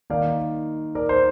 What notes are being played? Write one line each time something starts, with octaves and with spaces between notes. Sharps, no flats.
D#3 A#3 D#4 D5 F5
A#4 D5
C5